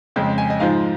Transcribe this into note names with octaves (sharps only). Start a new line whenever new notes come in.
F2 C#3 G#3
G#5
D#5
G#2 F3 G#3 F5